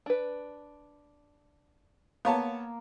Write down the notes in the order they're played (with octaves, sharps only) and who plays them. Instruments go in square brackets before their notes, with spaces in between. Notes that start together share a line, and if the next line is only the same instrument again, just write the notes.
[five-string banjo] D4 B4
[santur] A#3 [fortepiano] B3 C#5 A5